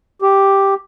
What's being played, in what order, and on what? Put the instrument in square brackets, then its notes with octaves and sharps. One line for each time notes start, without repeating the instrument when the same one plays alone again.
[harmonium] G4